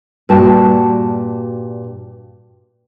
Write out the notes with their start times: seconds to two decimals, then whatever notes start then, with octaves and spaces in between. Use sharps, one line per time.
0.29 G2 A#2 F#4 G5 A5